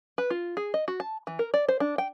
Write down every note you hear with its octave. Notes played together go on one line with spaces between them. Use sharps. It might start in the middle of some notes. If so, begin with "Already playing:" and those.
B4
F4
G#4
D#5
F#4
A5
E3
A#4
D5
C5
D4
G5